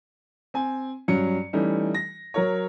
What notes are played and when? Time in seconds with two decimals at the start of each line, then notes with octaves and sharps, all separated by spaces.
0.54 C4 G#5
1.08 G2 F#3 C#4 C#7
1.53 E3 G3 A3 C#4 D#4
1.94 A#6
2.34 F#3 A#4 C#5